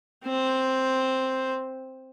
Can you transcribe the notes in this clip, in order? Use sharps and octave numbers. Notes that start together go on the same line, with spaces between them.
C4 C5